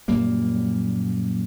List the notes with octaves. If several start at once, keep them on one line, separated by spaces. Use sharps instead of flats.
F#2 A#2 G3 A#3